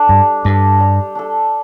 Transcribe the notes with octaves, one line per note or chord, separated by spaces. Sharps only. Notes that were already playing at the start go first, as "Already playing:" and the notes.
Already playing: D4 A4
G2 G3
G2 D4 A4
G3
D4 A4